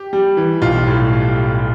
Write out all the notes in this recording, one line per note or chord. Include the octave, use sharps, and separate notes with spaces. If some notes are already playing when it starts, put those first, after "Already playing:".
Already playing: G4
G3
E3
B1 F4
A2